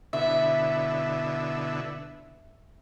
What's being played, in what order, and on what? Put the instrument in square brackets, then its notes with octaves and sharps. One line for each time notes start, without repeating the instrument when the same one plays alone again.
[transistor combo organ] B2 D3 E4 [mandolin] E5